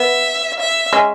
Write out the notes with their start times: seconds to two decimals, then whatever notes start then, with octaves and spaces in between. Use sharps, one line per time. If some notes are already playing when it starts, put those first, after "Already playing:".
Already playing: B3 E5
0.60 E5
0.93 G#3 C#4